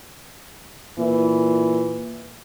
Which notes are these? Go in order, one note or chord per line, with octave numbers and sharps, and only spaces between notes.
A#2 E3